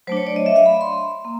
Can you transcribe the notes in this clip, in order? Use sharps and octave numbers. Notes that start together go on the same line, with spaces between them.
F#3 A3 D4 C5
C#5
D5
D#5
E5
F5
B5
C6
A#3